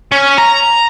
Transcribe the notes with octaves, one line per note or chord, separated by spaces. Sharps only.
C#4
A#5